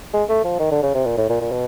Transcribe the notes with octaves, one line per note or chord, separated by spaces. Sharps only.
G#3
A3
F3
D#3
D3
C#3
C3
A#2
A2
A#2
A#2
B2